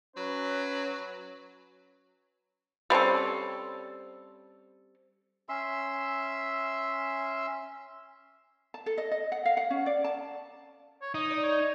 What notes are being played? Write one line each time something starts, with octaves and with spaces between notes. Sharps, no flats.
F#3 C#4 B4
G3 C4 C#4 A4
C#4 E5 C6 E6
A5
A4
D#5
D#5
F#5
F5
F#5
C#4
D5
A5
C#5
D#4 D#6
D5
C#5